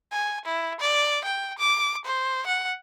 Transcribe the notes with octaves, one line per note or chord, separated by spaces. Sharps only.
G#5
E4
D5
G5
D6
C5
F#5